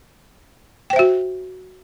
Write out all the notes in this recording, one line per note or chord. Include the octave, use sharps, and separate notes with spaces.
F#4 C5 E5 G5